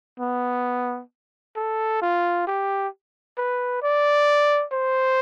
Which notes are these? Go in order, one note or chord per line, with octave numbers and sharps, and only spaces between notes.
B3
A4
F4
G4
B4
D5
C5